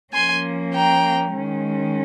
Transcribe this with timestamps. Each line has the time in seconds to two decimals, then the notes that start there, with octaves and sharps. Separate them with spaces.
0.13 F3 A#3 C#4 G#5 C6
0.74 G5 A#5
1.36 D#3 G#3 C#4